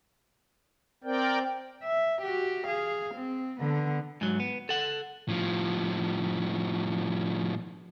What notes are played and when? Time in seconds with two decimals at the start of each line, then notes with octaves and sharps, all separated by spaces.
1.04 C4 A#4 D5 G5
1.84 E5
2.22 F#4 G4
2.68 G#4 F5
3.15 C4
3.61 D3 B3
4.21 G#2 F#3
4.40 B3
4.69 A4 F#5
5.28 A2 F3